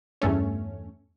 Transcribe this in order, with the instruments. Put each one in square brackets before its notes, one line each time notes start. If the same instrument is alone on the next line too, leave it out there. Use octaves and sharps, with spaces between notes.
[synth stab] E2 G2 A3 C#4